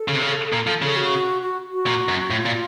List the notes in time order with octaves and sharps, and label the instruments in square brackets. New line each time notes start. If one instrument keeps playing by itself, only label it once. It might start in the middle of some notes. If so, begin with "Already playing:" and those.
Already playing: [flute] A4
[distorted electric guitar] C#3
C3
C#3
A#2
F3
C#3
[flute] F#4
F#4
F#4
[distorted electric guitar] A#2
F#2
[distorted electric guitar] A2 [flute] F4
[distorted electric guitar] A#2